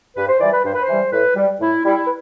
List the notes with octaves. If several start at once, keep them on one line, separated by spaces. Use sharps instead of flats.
G2 B4
C5
E3 G3 D5
B4
G2 C5
B4
C5
E3 G3
A2 B4
G3
A2 E4
G3 E4
B4